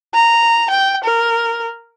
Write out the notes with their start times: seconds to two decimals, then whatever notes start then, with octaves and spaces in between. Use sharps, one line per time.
0.14 A#5
0.70 G5
1.04 A#4